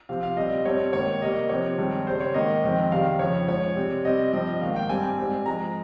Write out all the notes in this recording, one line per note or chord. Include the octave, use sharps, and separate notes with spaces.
C3 F3 C4 F5
F5
A#2 G3 C4 D#5
G2 G3 C4 C#5
G#2 D#3 A#3 C#5
C3 G3 A#3 D#5
C3 F3 C4 C#5
G2 D#3 G#3 C4
C#3 G3 C4 C5
C#5
G#2 D#3 A#3 D#5
F2 D#3 G#3 C4
C3 D#3 G3 F5
F2 C#3 F3 C#5
G#2 F3 G#3 C#5
C3 G3 C4
C3 G3 C4 D#5
G2 F3 C4 D#5
G#2 D#3 A#3 F5
G5
G2 G3 C4 G#5
G#2 G3 C4
G#2 F3 G#3 A#5